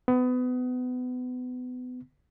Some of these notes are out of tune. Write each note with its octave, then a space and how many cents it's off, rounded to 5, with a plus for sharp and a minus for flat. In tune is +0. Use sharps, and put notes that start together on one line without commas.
B3 +25